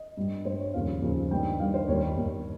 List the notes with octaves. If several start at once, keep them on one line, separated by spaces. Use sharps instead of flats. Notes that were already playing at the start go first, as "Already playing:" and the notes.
Already playing: D#5
G2 G3
G2 G3 C5
C#5
D#2 C#3 F3 F5
D#2 C#3 F3
G2 D#3 G3 G5
G2 D#3 G3 F5
C5
D#2 D#3 G3 C#5
D#2 D#3 G3